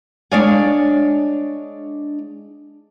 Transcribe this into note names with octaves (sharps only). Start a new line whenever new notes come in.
G#3 D4 C#5 D5 F5 G#5